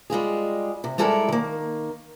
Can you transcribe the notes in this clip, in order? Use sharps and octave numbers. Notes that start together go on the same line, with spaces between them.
G3 G#3 F4 G#4
C3
G3 G#3 E4 A4 A#4 D5
D#3 A#3